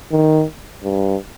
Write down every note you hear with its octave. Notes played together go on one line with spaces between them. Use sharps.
D#3
G2